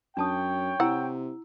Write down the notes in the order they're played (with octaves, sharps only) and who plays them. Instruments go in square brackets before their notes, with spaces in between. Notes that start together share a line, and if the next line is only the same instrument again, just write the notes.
[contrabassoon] F#2 [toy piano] D4 A5 D#6 [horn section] C#5 G5
[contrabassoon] C3 [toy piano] E4 A#5 E6 [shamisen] F#5